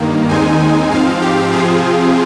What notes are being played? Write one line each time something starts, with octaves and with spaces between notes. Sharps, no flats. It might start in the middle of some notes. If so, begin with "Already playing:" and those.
Already playing: G2 D#3 A#3
D#2 D#3 G#3 C4 D#4 G#5
G#2 F3 C4 F5
G4
C3 F3 C4 F4 G#4